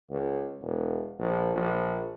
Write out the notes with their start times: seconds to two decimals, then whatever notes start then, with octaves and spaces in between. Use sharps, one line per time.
0.10 C#2
0.61 E1
1.19 A#1
1.55 A#1